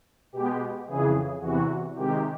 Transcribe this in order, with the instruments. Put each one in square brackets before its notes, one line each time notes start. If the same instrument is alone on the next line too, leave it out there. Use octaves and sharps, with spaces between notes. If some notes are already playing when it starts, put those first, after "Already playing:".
[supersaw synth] B2 G#3 B3 G4
F2 C#3 E3 G#4
E2 C3 E3 F#4
C3 D#3 G#3 G4